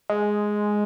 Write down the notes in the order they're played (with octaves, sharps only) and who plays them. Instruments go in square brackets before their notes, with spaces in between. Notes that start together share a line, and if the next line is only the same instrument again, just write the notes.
[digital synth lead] G#3